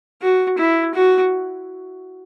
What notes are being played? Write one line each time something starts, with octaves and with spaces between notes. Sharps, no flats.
F#4
E4
F#4